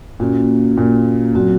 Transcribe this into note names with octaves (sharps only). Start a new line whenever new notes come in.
A#2 A#3 C#4 F#4
A#2
A#2 F#3 C4 F#4